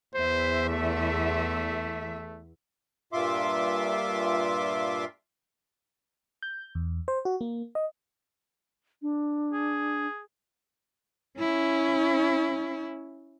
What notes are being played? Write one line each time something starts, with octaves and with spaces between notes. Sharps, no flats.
E2 C5 E5
A3
G2 A#2 F4 E5 C6 D6
G6
E2
C5
F#4
A#3
D#5
D4
G#4
C#4 E4